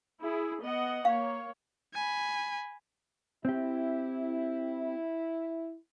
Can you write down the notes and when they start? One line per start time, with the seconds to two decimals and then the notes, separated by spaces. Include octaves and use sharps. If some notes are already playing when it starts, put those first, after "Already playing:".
0.21 E4 G#4
0.62 B3 D#5 F#5
1.05 A#3 C#5 F5
1.94 G#5 B5
3.45 C4 E4 G4